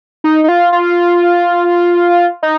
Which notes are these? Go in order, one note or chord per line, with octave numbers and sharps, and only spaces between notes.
D#4
D#4
F4
F4
D#4